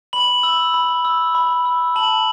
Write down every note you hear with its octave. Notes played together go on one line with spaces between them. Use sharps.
B5 F#7
E6
B5
E6
B5
E6
A5 F#7